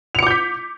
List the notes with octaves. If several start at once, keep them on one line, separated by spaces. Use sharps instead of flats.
D6 G6 B6 C#7 F7